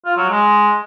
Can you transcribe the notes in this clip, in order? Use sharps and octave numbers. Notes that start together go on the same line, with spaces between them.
F4
F#3
G#3